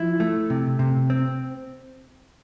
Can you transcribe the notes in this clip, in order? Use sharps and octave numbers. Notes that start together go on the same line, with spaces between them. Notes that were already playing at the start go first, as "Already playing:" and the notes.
Already playing: F3 E4
A3
C3
C3
C4